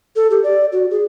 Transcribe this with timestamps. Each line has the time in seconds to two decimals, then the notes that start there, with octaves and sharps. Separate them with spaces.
0.16 A4
0.31 G4
0.44 D5
0.72 F#4
0.91 G#4